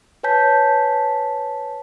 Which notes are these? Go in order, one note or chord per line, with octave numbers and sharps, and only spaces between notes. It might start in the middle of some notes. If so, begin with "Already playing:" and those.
B4 C#5 G#5 A5 G6 B6